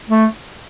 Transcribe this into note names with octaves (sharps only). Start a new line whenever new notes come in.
A3